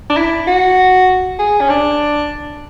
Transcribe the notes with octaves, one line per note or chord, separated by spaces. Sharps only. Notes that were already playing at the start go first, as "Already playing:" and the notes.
D4
E4
F#4
G#4
C#4
D4